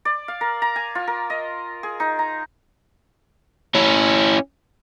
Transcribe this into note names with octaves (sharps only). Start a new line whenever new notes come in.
D5
F5
A#4
A#5
G#5
F4
A#4
D#5
G#4
D#4
A#5
C#4 E4